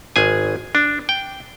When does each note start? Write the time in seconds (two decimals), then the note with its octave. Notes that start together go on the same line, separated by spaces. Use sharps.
0.16 G#1 G#4 G#5
0.75 D4
1.09 G5